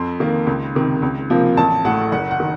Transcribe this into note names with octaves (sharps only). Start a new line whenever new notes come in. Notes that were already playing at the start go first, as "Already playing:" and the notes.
Already playing: F2 C6
D#3 A#3
C#2
C3 D#3
C#2
C3 F3 A#3
A1 A5
A2 A3 F#5
F#1 F#5
F#5
D#3